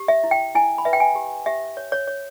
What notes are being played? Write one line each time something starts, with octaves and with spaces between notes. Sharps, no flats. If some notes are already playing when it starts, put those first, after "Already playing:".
Already playing: G4
E5
E4
G5
E4 G#5
B5
B4 E5
G5
G#5
G4
G4 E5
C#5
C#5
C#5